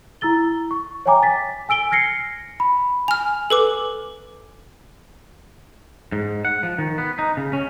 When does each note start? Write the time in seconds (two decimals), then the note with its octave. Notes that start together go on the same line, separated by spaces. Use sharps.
0.21 E4 A#5 E6 A6 G7
0.71 C#6
1.06 C#5 E5 G5 G#5 A#5 D6
1.23 A6 B6
1.69 G#5 E6 D7 G7
1.91 F6 G#6 A#6 C7 C#7
2.60 B5
3.08 G#5 F6 F7
3.50 A4 B4 D6
6.12 G#2
6.45 F#5
6.63 F3
6.78 D#3
6.98 B3
7.19 D#4
7.37 C#3
7.53 C#4